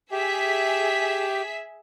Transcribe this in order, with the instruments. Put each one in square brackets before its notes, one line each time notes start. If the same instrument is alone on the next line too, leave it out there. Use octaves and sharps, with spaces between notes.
[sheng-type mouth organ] G4 [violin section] G#4 E5 B6